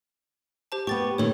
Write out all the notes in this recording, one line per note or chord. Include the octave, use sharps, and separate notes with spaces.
G4 C5 A5
B3 G4 C#6 A6
A#2 D#3 A4 C#5